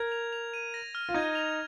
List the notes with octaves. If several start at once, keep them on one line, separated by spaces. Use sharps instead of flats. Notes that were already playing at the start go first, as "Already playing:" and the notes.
Already playing: A#4 G#6
F7
F7
D#7
A#6
F6
F4
D#4 G#6
F7